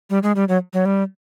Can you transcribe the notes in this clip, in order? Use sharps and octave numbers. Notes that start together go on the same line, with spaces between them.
G3
G#3
G3
F#3
F#3
G3